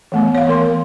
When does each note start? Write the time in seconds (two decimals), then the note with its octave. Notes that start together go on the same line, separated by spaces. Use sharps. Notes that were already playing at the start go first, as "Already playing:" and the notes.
0.12 E3 A3 B3
0.35 C#5 F5
0.47 E3 A#3 A#4 C6